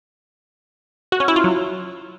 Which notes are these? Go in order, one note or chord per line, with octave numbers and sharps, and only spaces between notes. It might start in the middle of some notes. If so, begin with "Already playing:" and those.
F#4
C#4
E4
F4
F#3